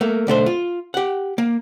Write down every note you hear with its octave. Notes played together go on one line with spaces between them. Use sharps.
A3 A#3
B1 D3 A3 C5
F4
G4 F#5
A#3